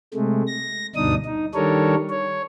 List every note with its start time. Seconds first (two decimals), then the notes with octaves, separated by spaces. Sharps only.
0.14 C3 G#3 A3
0.47 A#6
0.96 D2 G2 B2 D4 D#4 D#6
1.25 D#4
1.54 D#3 G3 D4 A4 A#4 C#5
2.10 C#5